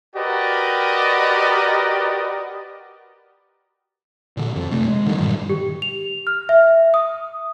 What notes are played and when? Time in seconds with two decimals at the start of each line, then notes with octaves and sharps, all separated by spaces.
0.16 F#4 G4 A#4 B4 D5 D#5
4.37 A#2 D3
4.56 F2 F3
4.72 C3 A3
4.85 G#3
5.06 D3 D#3 F#3 G3
5.18 G2 A#2 D#3 G3
5.50 G4
5.82 F7
6.27 F6
6.49 E5
6.94 D#6